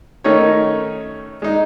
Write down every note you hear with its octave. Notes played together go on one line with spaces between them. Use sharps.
D#3 A3 C#4 D#4 A#4 C#5
G#3 D#4